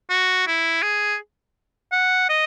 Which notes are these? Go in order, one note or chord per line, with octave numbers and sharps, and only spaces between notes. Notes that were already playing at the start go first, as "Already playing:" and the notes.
F#4
E4
G#4
F#5
D#5